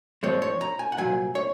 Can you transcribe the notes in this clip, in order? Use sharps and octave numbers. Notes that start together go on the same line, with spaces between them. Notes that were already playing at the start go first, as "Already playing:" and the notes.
G#2 F3 G#3 C4 C#5
C#5
A#5
G#5
F#5
C2 A#2 F#3 G#5
C#5